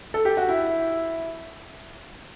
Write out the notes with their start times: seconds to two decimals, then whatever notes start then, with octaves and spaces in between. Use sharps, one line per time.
0.14 A4
0.25 G4
0.37 F#4
0.49 E4